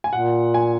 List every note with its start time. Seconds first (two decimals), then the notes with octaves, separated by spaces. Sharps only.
0.04 G#5
0.13 A#2 F#5
0.54 G#5